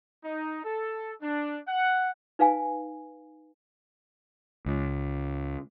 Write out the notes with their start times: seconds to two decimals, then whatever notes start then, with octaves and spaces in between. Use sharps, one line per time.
0.25 D#4
0.64 A4
1.22 D4
1.68 F#5
2.39 D#4 B4 F5 G#5
4.66 C#2